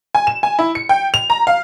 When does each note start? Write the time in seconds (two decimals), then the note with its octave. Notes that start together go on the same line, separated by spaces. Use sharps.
0.15 G#5
0.27 E7
0.43 G#5
0.59 E4
0.75 C#7
0.89 G5
1.14 F7
1.30 A#5
1.47 F5